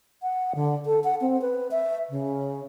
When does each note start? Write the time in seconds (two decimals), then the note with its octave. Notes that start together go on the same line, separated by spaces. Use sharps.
0.22 F#5
0.55 D3
0.86 A4
1.04 F#5
1.21 C4
1.42 B4
1.71 E5
2.10 C#3